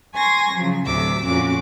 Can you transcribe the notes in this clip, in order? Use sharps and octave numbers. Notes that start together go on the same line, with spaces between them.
G#5 C6 C#6 G#6 A#6
C#3 F3 F#3
D2 A2 C3 F#3 D6 E6
F2 A#2 C#4 F#4 D6